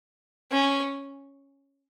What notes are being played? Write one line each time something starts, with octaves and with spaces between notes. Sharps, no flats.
C#4